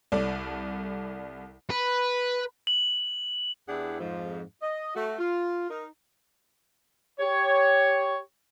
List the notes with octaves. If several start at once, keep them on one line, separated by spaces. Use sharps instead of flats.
C2 A4 D5
B4
F#7
E2 D4 E4 G4 G#4 F#5
F2 G#2 F3
D#5
A3 F#4
F4
D#4 A#4
G4 C#5